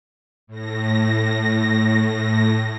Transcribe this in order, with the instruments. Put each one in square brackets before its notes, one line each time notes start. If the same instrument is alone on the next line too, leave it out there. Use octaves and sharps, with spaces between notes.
[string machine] A2 A#6